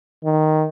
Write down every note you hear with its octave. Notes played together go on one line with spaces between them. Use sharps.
D#3